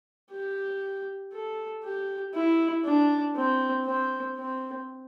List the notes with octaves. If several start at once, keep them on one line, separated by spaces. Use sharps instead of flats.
G4
A4
G4
E4
D4
C4
C4
C4